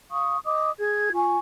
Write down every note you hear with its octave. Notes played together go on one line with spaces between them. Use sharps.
F5 C#6 D#6
D#5 D6 D#6
G#4 G#6
F4 G#5 C#6